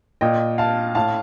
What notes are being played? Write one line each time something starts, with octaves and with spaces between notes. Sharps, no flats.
A#2 D#5 G5
F5 A5
A2 F5 A5